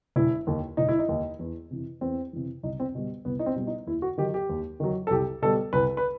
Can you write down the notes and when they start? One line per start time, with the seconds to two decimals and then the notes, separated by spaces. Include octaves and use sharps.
0.16 E1 E4
0.47 D#2 D#3
0.77 E1 D#4
0.89 E4
0.99 D#4
1.08 D#2 D#3
1.39 E2
1.71 C3 E3
2.01 E2 C4
2.33 C3 E3
2.63 C2 D#4
2.80 C4
2.95 B2 G3
3.25 C2 B3
3.39 D#4
3.46 C4
3.56 B2 G3
3.67 D#4
3.87 D#2 E4
4.02 F#4
4.18 D#3 F#3 G4
4.34 G4
4.49 D#2
4.80 D#3 F#3
5.07 A4
5.11 C2 G4
5.42 B2 G3 A4
5.73 C2 B4
5.97 B4